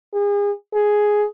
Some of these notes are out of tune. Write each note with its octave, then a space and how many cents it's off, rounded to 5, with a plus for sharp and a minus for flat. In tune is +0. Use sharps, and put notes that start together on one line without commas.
G#4 -35
G#4 +5